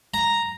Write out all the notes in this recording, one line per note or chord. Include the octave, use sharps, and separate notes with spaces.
A#5